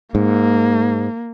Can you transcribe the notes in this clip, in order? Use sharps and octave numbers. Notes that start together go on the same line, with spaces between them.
G#2 A#3